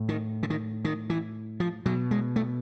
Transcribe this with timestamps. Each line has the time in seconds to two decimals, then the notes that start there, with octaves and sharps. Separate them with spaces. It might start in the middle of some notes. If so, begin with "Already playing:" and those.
Already playing: A2
0.09 D#3
0.43 D3
0.50 D#3
0.85 D#3
1.10 E3
1.60 F3
1.86 B2 F#3
2.11 G#3
2.36 A3